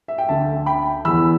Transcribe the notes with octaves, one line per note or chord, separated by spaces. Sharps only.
E5
G5
D2 D3 E5 A5
G5 B5
E2 E3 B5 E6